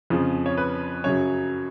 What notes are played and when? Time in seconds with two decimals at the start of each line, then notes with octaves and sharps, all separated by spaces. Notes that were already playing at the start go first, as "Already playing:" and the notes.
0.10 F2 C#3 F3
0.46 C#5
0.57 B4
1.04 F#2 C#3 F#3 C#5